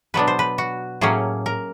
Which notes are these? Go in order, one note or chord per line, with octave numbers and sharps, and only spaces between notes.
B2 F#3 B3 D4 B4
C5
B4
F#4
A2 F#3 A#3 C#4 G#4
A#4